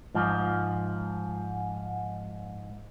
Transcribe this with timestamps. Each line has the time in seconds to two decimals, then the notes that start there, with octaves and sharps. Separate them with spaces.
0.15 G#2 F3